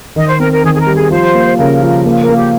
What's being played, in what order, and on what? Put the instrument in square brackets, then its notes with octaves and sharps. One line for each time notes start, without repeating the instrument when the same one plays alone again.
[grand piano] D#3 [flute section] D#5
[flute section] C5
[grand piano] C4 [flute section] A#4
[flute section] A#4
[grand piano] D#3 [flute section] G#4
[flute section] G#4
A#4
[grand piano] G3
[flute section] G#4
[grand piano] F3 [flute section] C5
[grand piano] A#3
[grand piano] C#3 [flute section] A#4
[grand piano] F3
A#3
[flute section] A#4
[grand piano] A#3
[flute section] G4